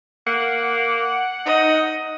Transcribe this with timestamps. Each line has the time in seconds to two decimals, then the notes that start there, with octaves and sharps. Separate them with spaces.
0.27 A#3 F#5
1.46 D#4 D#5